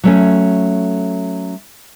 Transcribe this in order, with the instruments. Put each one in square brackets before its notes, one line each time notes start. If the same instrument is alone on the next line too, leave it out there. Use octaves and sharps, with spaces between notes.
[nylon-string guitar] F#3 A3 C#4